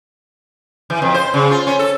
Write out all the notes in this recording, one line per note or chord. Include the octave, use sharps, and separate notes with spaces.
E3
F2
C5
C#3
F4
C#4
A4